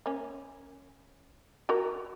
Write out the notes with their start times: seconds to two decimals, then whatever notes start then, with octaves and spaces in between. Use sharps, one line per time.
0.06 A#3 C#4
1.69 F#4 A#4